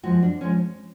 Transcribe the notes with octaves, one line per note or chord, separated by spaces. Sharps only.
F#2 F3 G#3 F#4
D4
F3 G#3 C#4